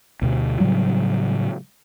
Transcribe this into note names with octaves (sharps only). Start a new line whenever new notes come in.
D2 B2
A2 C#3 F#3 G3